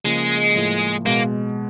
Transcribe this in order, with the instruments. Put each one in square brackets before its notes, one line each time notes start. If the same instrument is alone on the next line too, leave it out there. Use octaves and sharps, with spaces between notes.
[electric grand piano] C#3 F3 A#3 [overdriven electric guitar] G#3
[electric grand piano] A2 F3 A#3
[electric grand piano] B2 G#3 [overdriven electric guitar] A#3